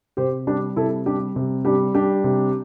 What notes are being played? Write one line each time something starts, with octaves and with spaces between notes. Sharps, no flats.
C3 G4 C5
G3 D4 G4
C3 E4 A4
G3 D4 G4
C3
G3 D4 G4
G3 D4 G4
C3